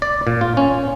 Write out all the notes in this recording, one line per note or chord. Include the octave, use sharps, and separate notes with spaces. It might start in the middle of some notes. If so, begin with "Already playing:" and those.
D5
A#2
F4
C#4